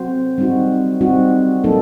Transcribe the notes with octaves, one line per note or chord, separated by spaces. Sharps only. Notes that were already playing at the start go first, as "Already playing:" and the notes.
Already playing: F#3 C4 F#4 C5
G3 C4 D#4 F#4
G3 C4 D#4 F#4
F#3 A#3 D#4 A4